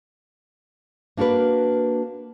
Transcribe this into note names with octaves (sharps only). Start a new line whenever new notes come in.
A#3 D4 F#4 A#4 B4